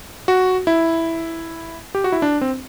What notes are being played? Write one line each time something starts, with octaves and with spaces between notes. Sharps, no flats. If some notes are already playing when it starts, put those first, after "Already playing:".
F#4
E4
G4
F#4
E4
D4
C4